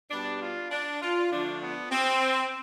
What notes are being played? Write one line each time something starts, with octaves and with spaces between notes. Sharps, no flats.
B2 G3 B3 D4
F4
D4
F4
D3 F3 A3 D4
B3
C4